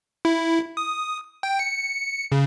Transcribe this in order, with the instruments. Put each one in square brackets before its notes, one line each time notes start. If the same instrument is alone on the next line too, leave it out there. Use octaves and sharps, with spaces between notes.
[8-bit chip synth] E4
D#6
G5
C#7
C#3